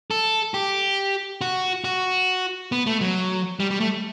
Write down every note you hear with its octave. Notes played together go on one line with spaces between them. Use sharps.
A4
G4
F#4
F#4
B3
A3
F#3
G3
G3
A3